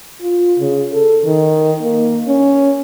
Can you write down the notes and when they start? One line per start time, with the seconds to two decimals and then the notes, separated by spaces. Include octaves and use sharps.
0.21 F4
0.59 C#3
0.93 A4
1.25 D#3
1.82 A#3
2.27 C#4